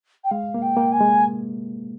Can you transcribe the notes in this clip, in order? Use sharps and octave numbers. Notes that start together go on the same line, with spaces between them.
G5
G#3 F5
A#3
G5
A#3
G#5
G#3